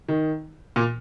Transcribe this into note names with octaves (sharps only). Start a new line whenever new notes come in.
D#3
A#2